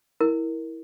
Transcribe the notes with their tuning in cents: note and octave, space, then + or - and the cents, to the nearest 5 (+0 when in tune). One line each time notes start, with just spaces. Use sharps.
E4 -10 A#4 +0